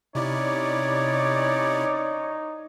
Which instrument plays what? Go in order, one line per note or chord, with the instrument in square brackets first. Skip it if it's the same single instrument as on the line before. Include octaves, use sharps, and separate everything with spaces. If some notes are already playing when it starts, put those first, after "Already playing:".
[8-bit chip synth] C3 E4 [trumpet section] C#4 C#5 D5 [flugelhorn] D#4